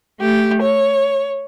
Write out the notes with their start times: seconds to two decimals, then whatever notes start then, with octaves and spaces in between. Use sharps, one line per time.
0.20 A3 G4
0.63 C#5